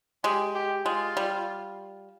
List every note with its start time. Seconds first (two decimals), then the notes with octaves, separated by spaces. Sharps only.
0.24 G#3 G4
0.55 G4
0.85 G#3 F4
1.17 G3